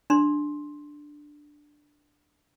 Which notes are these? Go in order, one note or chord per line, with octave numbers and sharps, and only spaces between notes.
D4 C6